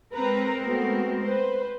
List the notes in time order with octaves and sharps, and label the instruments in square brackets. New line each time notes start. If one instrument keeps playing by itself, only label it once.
[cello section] G#3 C4 A#4 [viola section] B4 A#5
[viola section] A3 B3 F#4
B4 C5